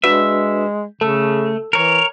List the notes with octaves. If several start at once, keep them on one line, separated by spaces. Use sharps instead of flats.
G#3 D4 F#4 B4 E5
C#3 A3 A4 E6
E3 A#4 C#5